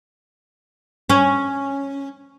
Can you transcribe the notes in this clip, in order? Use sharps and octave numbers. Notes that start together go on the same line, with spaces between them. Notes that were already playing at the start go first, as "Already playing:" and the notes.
C#4